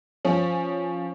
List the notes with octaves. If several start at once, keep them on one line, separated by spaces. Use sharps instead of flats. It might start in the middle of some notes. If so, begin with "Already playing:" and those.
F3 C#4